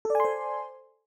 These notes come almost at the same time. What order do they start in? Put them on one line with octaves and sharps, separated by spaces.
A4 D5 G#5 C6 C5